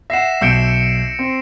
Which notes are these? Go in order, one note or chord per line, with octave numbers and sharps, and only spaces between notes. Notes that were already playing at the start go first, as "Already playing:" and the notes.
E5 F#5 A#6 C7 E7
B1 E5 E6 G6 C#7 D7
C4